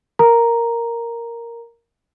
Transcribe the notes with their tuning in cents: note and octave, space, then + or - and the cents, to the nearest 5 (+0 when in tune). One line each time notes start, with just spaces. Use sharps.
A#4 +0 A#5 +0